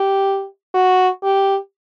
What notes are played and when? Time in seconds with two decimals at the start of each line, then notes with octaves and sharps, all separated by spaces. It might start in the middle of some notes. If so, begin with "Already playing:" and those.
Already playing: G4
0.75 F#4
1.23 G4